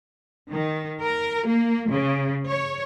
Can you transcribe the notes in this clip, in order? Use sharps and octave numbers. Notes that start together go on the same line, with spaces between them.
D#3
A#4
A#3
C#3
C#5